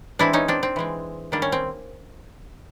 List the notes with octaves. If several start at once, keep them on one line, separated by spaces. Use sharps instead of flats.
E3 G#3 C4 D4 E4
C#4 D#4
C4 D4
C4
E3 G#3 C4
D#3 G3 A#3 D4
C#4
C4